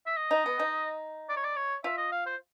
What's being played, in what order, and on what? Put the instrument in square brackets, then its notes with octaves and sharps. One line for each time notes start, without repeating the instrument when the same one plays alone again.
[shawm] E5
D#5
[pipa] D#4
B3
D#4
[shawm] D5
C#5
D5
C#5
[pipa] F4 [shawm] E5
[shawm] D#5
F5
C5